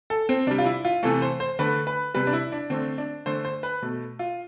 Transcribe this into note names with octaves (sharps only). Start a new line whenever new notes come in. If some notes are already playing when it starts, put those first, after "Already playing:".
A4
C4
C3 G3 D4
F4
E4
F4
C3 E3 A3 A4
C5
C5
D3 A3 B4
B4
C3 G3 B4
D4
E4
D4
D3 A3 C4
D4
D3 A3 C5
C5
B4
B2 A3
F4